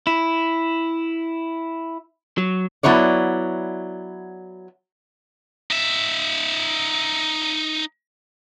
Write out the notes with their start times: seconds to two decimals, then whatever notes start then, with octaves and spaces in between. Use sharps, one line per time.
0.07 E4
2.38 F#3
2.83 F#3 B3 E4 C#5 D5
5.71 D#4 E5